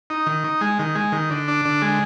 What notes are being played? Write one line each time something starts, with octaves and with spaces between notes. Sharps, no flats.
D#4
D#3
D#4
G#3
D#3
G#3
D#3
D3
D4
D3
G#3